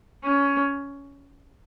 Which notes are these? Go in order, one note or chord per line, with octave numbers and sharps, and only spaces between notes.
C#4